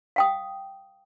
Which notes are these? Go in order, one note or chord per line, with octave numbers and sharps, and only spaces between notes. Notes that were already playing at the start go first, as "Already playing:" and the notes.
F5 G5 D#6